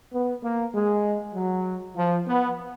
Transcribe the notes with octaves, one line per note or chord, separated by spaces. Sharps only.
B3
A#3
G#3
F#3
F3
B3